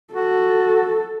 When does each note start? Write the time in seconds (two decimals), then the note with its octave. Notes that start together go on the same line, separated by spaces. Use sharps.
0.14 F#4 A4